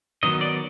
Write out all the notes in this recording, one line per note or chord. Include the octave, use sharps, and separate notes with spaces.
D#3 F#3 B3 D#5
D5